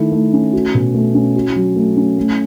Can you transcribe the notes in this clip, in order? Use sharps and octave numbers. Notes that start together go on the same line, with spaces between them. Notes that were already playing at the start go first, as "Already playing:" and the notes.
Already playing: D#3 A3 E4
A3
C#4
F#4
B2
A3
C#4
F#4
F#3
A3
C#4
A3